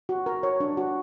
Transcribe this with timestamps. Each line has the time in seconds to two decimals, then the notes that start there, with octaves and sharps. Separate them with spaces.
0.09 F#4
0.26 A#4
0.43 C#5
0.60 D4
0.77 F#4